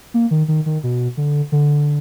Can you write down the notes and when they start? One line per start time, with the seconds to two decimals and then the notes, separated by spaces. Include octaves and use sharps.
0.14 A#3
0.31 D#3
0.48 D#3
0.66 D#3
0.83 B2
1.17 D3
1.52 D3